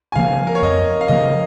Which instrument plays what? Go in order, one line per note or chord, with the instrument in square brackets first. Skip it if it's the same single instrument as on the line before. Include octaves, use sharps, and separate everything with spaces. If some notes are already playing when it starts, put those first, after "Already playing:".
[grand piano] G#5
[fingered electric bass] C#3 F3 A#3 [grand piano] F5
[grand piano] A#4
C#5
[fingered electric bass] F2 [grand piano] D#5
[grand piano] F5
[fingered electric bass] C#3 F3 A#3 [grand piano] D#5